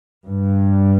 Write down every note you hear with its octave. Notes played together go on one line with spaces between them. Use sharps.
G2